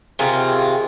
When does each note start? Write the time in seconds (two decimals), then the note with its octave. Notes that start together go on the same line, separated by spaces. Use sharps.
0.19 C3 D#3 F4 G#4